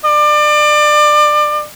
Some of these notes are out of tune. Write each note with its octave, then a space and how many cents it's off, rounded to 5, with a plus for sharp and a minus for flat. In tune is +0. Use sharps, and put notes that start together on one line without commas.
D5 +30